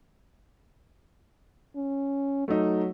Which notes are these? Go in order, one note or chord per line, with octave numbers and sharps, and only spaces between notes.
C#4
F#3 A3 D#4